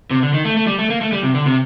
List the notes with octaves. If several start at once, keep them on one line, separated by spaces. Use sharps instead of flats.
C3
D3
D#3
A3
A3
G3
A3
A#3
A3
G3
C3
D3
C3